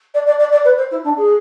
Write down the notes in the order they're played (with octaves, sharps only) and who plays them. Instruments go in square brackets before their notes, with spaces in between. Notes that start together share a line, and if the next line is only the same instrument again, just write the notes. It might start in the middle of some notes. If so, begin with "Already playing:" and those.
[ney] D5
D5
D5
D5
B4
C5
E4
D4
G#4